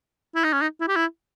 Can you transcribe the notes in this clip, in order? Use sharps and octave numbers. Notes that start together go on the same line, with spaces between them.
E4
D#4
C#4
D#4
E4
G4
E4